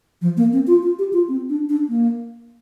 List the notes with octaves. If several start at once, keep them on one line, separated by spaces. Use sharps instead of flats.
F3
A#3
C4
F4
F4
G4
F4
C4
D4
D4
A#3